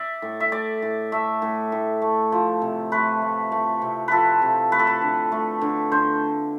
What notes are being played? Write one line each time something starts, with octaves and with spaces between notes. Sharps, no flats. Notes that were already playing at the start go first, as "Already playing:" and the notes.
Already playing: D5 E5
A2
E5
A2 D5
A2
A3 E5
A2
A2
A3
F3
C3
A3 B4
A3
A3
C3
F3 A4 B4
C3
A3 B4
A4
B4
D3
A3
D3
D3 C5